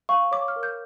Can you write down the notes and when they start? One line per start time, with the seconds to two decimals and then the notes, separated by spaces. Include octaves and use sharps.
0.09 F5 C#6
0.31 C#5 D6
0.48 F6
0.56 A#4
0.63 G6